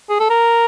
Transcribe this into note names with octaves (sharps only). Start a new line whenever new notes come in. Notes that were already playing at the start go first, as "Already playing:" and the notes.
G#4
A4
A#4